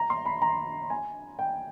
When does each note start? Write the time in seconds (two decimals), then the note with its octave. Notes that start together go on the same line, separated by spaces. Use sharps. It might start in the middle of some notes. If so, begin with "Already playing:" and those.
Already playing: A#5
0.10 C6
0.26 B5
0.42 A#5
0.90 G#5
1.39 G5